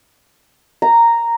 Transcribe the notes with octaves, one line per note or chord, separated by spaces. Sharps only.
A#5